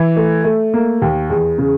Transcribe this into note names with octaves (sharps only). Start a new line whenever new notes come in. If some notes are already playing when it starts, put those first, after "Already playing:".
Already playing: E3
A3
A3
A#3
D#2
E2
C#3